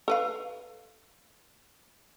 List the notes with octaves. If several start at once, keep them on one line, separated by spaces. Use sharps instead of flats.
A4 B4 F5